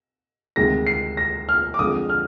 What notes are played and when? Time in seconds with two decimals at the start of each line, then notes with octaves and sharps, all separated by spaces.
0.56 D2 C3 D#3 G#3 A#6
0.87 C7
1.17 A#6
1.49 F6
1.74 D6
1.79 F2 D3 G#3 D#6
2.09 F6